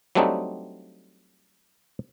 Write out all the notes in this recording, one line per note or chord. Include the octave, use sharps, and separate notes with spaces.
F#3 G3 A3 C4 D4 D#4